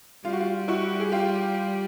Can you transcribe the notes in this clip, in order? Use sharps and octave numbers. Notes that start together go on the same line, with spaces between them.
G3 F4
F#4
F4
E4 F#4
G#4
F4 G4